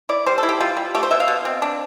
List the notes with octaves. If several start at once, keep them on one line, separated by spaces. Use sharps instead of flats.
E4 D5
G3 C5
A4
E4
G4
G3 F4
G3
A3 G4
C5
B2 E5
F5
B2
C4
D4